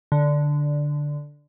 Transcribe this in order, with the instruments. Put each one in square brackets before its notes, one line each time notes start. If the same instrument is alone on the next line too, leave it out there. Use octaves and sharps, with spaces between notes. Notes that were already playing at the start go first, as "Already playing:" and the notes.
[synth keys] D3